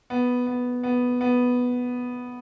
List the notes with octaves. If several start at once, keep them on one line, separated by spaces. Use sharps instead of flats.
B3
B3
B3
B3